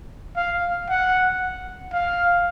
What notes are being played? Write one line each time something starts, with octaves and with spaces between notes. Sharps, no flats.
F5
F#5
F5